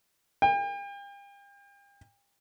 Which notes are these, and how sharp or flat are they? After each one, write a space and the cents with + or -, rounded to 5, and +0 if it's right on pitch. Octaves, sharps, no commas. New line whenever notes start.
G5 +40